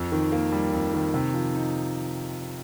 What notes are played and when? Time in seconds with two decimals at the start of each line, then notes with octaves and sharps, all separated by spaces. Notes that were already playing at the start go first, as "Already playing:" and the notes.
Already playing: F2
0.12 D#3
0.32 A#3
0.52 G3
0.73 F2
0.94 D#3
1.14 C3
1.34 F3
1.55 D#4